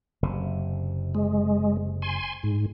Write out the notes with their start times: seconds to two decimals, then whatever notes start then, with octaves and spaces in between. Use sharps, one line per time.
0.23 F#1 C3
1.15 G#3
2.02 G#5 C6
2.43 G#2